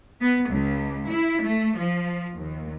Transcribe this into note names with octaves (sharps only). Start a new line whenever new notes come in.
B3
C#2
E4
A3
F3
D#2